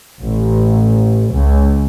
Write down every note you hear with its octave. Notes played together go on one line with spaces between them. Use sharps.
A1
C#2